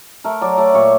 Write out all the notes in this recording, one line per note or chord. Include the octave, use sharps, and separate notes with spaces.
A3 A#4
F#3 D5
A3 D5
A#2 C#5